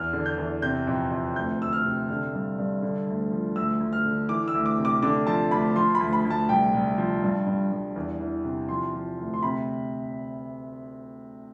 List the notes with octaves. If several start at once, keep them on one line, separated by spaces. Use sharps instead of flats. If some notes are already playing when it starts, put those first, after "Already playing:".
Already playing: E2 F6
D3
G6
E2
C3 G6
F2
F2
D2 G6
D2 E6
F6
C3
D3 F6
G2
G2
D3
D2
F3
D2 E6
D2
F6
D3
E3 D6
E6
D2
D6
C3
D6
D3 D6
F3 A5
D2 B5
F3 C6
B5
D2
B5
D2
A5
C2 G5
C2
F3
G2
G2
G2
E2
E3
C3
F3 C6
F3
D2
C6
C3 B5